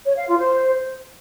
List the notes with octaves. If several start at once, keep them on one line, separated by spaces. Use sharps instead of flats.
C#5
F5
F4
C5